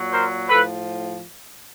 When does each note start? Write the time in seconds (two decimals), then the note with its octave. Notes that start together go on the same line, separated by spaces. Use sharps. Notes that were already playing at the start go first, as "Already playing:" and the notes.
Already playing: A#2 F#3
0.13 A#4 C5
0.50 A2 F3 A4 B4